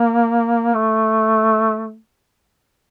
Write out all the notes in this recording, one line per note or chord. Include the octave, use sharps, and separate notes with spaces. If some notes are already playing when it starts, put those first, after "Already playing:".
Already playing: A#3
A3